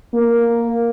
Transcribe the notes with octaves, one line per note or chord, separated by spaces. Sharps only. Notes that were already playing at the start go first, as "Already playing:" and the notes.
A#3